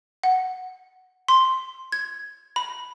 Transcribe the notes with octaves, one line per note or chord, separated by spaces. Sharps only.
F#5
C6
G#6
B5